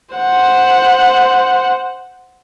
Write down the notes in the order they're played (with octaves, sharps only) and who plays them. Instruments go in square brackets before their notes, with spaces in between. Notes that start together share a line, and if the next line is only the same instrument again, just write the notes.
[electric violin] C5 F#5